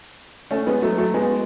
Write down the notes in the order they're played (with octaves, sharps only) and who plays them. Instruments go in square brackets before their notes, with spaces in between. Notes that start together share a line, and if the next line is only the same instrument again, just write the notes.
[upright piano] A3 C#4
G#3 B3
F#3 A3
F#3 A3
G#3 B3